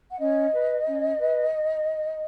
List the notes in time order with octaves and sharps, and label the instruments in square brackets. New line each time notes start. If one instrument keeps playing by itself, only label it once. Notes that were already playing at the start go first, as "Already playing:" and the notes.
[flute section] F#5
C#4 D#5
B4
C#4
B4